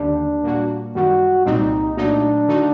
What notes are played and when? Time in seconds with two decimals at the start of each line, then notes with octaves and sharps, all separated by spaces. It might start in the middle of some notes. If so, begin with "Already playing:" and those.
Already playing: D#2 D3 G3 D4
0.43 A#2 G3 A#3 F#4
0.95 F#2 D#3 G3 F#4
1.45 C2 A#2 G3 C4 D#4
1.97 A#2 F#3 A3 D4 D#4
2.48 D3 A3 D#4 F#4